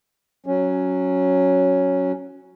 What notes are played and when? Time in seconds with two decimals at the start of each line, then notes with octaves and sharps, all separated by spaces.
0.46 F#3 C#4